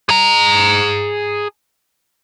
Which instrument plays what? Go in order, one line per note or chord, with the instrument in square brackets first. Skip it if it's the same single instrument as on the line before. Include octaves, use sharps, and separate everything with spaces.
[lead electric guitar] G#4 A#5